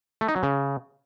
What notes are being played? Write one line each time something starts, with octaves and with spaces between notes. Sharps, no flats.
A3
D#4
F#3
C#3